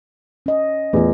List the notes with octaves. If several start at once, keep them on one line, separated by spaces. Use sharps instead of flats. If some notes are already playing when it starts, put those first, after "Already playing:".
C#4 D#5
E2 A3 F4